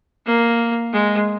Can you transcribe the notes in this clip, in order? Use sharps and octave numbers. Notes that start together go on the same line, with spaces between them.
A#3
G#3